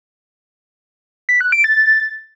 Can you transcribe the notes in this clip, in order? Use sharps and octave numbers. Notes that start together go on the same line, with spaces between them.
B6
F#6
D7
A6